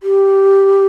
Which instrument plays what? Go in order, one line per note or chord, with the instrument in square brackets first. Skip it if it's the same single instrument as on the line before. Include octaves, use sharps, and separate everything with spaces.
[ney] G4